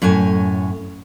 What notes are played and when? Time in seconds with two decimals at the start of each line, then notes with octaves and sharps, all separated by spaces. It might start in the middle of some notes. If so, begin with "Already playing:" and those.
0.02 F#2 A2 C#5 G#5